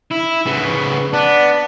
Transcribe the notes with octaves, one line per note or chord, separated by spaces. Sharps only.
E4
C#3 B3
B3 D4